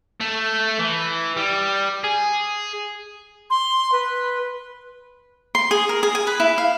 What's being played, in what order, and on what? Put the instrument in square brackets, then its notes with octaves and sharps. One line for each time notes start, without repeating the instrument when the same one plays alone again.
[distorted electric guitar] A3
E3
G3
G#4
[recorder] C6
B4
[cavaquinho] C6
G#4
A#4
G#4
G#5
B4
E4
F5